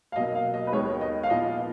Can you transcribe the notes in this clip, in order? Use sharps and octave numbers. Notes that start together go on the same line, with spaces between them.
F5
B2 F#3 A#3 D#5
F5
D#5
B4
D#2 D#3 G#3 B3 C#5
D#5
F5
A#2 F3 B3 D#5